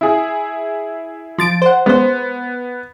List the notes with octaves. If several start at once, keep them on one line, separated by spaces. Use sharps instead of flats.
E4 G#4
F3 A6 D7
C5 F#5
G#3 B3 C5